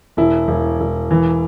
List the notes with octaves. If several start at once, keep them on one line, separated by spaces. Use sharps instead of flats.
E1 E4
E1
E1
E3